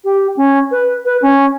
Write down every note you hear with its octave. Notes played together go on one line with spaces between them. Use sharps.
G4
C#4
B4
B4
C#4